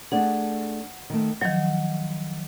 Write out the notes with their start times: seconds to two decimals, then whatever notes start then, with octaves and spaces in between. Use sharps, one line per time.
0.12 A3 D4 G#4 F#5
1.10 D#3 A3
1.41 D#3 F3 F#3 F#5